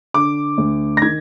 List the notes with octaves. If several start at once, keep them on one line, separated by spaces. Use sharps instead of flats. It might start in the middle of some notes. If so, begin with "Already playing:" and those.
D3 D6
D2
A#6
D#3 G#6